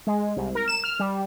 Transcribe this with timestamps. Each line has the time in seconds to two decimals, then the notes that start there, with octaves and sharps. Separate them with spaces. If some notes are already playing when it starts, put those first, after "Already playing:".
0.07 G#3
0.37 C2
0.55 A#4
0.68 E7
0.84 F6
0.99 G3